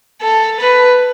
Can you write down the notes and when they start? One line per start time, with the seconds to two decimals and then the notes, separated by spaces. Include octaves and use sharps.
0.22 A4
0.60 B4